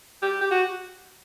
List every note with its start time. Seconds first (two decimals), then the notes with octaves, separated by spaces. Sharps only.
0.22 G4
0.41 G4
0.51 F#4